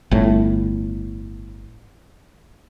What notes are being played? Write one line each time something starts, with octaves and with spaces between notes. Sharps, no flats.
G1 A2